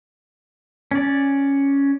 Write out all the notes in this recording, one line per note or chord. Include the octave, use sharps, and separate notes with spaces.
C#4 D5